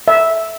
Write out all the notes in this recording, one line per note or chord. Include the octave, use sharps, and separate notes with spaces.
E5